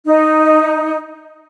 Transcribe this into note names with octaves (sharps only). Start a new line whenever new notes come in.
D#4